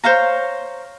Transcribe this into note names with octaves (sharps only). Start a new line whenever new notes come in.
C5 C#5 F5 A#5